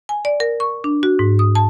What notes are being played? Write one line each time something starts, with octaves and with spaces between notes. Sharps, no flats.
G#5
D5
A#4
C#6
D4
F#4
G#2
D#6
A5